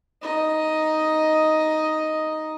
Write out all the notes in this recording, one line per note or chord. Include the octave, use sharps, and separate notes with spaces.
D#4 D#5